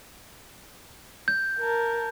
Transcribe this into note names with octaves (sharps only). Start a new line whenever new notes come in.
G6
A#4 A5